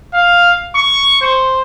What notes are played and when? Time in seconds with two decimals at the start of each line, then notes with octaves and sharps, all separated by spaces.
0.13 F5
0.75 C#6
1.22 C5